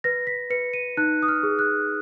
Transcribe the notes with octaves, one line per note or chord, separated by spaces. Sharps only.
B4 A#6
B6
B4 C#7
D#7
D#4 F#6
D#6
F6
G#4
F#6